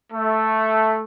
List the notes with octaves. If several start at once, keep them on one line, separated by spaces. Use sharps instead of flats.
A3